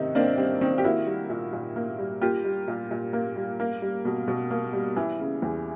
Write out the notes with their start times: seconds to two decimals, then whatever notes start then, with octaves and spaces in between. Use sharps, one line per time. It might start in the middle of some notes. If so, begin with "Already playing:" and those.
Already playing: C3 D#3 D#4
0.15 A#3 C4 D4
0.38 G3 C4
0.61 D#3 C4
0.78 G4
0.84 A#3 E4 F#4
1.06 G3
1.30 A#2
1.53 A#2
1.76 A#3
1.98 G3
2.21 A#3 F4 G4
2.45 G3
2.68 A#2
2.91 A#2
3.13 A#3
3.36 G3
3.60 A#3
3.82 G3
4.05 B2
4.28 B2
4.51 A#3
4.73 G3
4.96 E3
5.19 C#3
5.42 E2